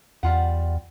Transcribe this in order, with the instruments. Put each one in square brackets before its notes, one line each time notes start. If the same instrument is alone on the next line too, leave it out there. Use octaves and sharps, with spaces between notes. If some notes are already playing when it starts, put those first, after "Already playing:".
[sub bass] E2 [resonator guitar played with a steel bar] G3 F4 F#5